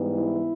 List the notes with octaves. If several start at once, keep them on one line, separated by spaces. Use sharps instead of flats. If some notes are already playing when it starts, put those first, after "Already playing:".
Already playing: G#2 E3 G3 B3
E4